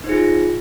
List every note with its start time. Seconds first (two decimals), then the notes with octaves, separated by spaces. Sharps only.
0.04 D#4
0.06 C5
0.09 G#4
0.11 F4